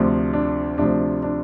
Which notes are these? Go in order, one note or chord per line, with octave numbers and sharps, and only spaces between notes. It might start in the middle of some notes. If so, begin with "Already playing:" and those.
Already playing: D2 C3 F3 D4
D4
D2 C3 F3 D4
D4